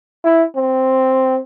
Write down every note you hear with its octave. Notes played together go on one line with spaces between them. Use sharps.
E4
C4